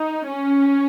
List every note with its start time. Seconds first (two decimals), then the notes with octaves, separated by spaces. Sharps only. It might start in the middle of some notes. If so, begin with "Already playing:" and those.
Already playing: D#4
0.27 C#4